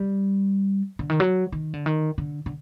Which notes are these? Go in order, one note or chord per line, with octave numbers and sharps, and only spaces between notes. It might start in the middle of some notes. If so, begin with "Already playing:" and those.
Already playing: G3
D3
D#3
F#3
D#3
D3
D#3
D3
D3